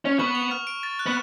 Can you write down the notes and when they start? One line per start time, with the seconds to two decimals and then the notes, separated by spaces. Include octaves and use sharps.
0.05 C#4
0.19 B3 C#6
0.35 F7
0.51 F6
0.67 D7
0.83 A6
0.99 F#6
1.06 B3